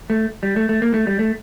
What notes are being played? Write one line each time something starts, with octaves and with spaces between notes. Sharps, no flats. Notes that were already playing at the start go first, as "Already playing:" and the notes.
A3
G3
A3
A3
A#3
A3
G3
A3